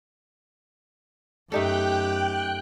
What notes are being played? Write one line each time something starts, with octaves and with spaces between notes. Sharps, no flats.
F#2 A3 D#4 G4 A4 G5 F#6